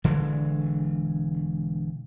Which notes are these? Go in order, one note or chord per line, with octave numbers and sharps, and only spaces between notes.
E1 D3 E3 G#3